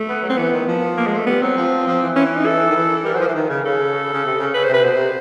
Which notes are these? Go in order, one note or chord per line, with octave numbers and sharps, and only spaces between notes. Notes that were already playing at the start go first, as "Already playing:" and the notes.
Already playing: A3
B3
F#3
C4
E3 B3
D#3
F3
A#3
G#3
A3
G3 B3
F#3 C4
F3
F3
E3
E3 C#4
C#4
D#4
A4
D#3
E3
G3 A#4
F#3
C5
F3
E3 C5
D#3
C#3
C#3 A4
C#3
C3
C#3
C#3 B4
C5
C3 B4
B2 C5
C3